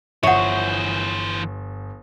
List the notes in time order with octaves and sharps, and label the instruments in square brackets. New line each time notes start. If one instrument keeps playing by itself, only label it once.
[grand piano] G1 F3 D#6 [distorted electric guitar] E3 C5 [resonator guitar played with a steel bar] C#5 [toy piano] E5 F#5